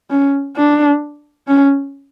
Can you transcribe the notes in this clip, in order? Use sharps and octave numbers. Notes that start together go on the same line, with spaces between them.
C#4
D4
C#4